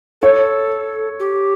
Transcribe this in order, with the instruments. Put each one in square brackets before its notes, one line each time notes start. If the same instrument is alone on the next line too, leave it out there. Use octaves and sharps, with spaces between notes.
[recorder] A4 [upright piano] C#5
[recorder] G4